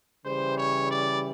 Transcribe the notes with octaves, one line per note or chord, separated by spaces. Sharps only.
C#3 E3 G3 C5
C#5
D5